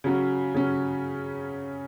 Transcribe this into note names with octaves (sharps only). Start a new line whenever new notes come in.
C#3 F#3 C#4
C#3 F#3 C#4